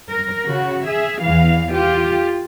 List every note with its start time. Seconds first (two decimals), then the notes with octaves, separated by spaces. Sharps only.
0.10 A#4
0.46 C#3 F#4
0.86 G#4 E5
1.23 E2 E3 F5
1.72 F4 G4